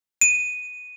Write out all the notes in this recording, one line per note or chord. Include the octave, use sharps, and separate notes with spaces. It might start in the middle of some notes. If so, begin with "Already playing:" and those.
D#7